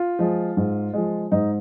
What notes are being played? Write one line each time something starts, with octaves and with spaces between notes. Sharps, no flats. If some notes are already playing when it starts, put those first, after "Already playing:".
Already playing: F4
F3 G#3
G#2
F3 G#3
G#2 D#4 D#5